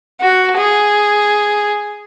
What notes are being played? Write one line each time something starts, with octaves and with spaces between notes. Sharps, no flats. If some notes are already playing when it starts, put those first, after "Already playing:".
F#4
G#4